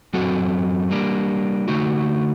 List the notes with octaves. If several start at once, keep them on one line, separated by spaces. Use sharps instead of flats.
F#2 F#3 C4 F#4 A4
G3 A#3 D4
D3 A3 D#4 F#4